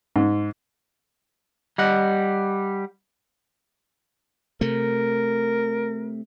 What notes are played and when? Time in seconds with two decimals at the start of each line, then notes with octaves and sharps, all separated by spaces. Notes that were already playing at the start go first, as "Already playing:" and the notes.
0.16 G#2
1.78 G3 D#5 F#5
4.61 C3 A3 A#4